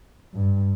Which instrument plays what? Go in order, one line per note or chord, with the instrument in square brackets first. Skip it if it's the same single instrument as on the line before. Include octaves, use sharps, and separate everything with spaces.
[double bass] G2